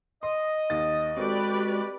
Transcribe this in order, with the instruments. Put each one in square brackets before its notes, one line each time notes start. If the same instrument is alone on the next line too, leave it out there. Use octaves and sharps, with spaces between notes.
[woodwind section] D#5 [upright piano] C6
[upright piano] D#2 D#3 A6 [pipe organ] D#6
[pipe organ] G#3 F#4 [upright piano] C4 A4 [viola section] G4 B4 D5